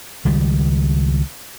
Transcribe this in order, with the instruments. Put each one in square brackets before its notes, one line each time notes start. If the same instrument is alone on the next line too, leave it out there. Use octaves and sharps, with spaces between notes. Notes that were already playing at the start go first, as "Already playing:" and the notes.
[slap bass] C#2 D#3 G3